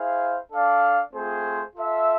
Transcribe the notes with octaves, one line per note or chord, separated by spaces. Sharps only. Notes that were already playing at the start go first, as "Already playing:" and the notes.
Already playing: E4 G#4 C5 F5
D4 A4 D5 F5
A3 C4 F4 G#4 C5
F4 A4 E5